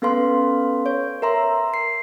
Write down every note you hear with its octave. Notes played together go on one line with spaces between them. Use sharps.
B3 C#4 A4 B4 F5 C6
C#5
A#4 E5 A#5 C6
C7